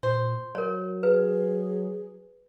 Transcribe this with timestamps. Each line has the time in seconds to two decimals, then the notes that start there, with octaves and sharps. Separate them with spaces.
0.03 A#2 C5
0.55 F#3 A#4 C#5
1.03 G#4 B4